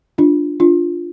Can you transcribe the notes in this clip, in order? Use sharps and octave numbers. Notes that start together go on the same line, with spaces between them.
D4 F4
D4 F4